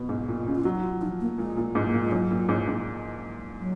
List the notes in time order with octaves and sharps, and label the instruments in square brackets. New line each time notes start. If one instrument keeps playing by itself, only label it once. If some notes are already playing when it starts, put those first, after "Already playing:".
Already playing: [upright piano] B2
G#2
A#2
C#3
[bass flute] F4
[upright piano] F#3 [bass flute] F#4
[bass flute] D#4
F4
[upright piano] F3 [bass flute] D#4
[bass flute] A#3
[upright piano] A#2 [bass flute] G#3
[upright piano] A#2
G#2
[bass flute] A#3
[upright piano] A#2
[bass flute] G#3
[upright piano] G#2 [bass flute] F#3
[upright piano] A#2
G#2
G#2
[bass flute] F#3